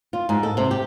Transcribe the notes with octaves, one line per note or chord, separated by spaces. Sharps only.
F4
G#2
A4
C3
G4